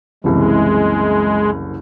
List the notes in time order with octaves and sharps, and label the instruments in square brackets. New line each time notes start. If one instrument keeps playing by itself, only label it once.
[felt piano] F#1 C2 E3 [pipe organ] G#3